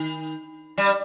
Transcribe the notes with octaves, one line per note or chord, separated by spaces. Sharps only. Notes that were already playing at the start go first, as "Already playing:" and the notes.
Already playing: D#3
G3